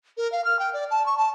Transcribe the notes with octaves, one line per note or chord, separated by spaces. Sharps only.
A#4
F5
F6
G5
D5
A5
C#6
A5